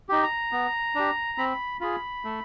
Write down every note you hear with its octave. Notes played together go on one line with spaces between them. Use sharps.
D#4 G4
A#5
B3
D4 G4
C4 B5
F4 G#4 B5
A3